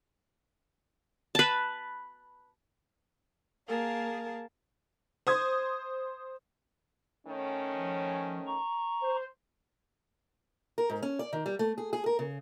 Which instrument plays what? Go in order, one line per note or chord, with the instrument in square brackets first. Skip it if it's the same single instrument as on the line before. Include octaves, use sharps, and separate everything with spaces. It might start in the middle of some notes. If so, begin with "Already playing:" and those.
[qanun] B4 A5
[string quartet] A#3 G#4 A#4 F5 A5
[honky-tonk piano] C5 D#6 G#6
[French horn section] D#3 A3 C#4
[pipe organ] F3
A#5 C#6
[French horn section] C5
[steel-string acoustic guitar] A#4
G#2
C#4
D5
D#3
G3
A3
G#4
G#4
A#4
C#3